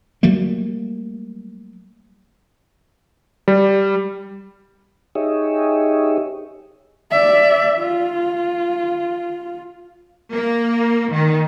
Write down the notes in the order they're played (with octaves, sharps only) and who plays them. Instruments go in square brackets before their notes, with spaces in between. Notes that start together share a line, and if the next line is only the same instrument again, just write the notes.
[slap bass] F#3 G3 A3 A#3
[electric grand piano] G3
[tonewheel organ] D#4 G4 G#4 C#5 D#5 E5
[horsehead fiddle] D5 E5
F4
[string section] A#3
D#3